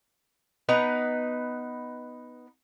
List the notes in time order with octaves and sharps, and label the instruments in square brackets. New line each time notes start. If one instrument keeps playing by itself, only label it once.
[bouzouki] B3 D#4 B4 A#5